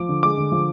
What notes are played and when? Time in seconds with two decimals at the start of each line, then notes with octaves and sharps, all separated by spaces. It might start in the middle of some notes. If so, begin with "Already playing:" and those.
Already playing: F3 D6
0.09 D3
0.23 G#3 D6
0.38 D3
0.52 F3